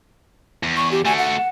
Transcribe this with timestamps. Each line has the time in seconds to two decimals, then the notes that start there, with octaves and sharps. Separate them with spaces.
0.63 E2
0.76 C#6
0.92 G4
1.05 A3 F#4 G#5
1.18 F#5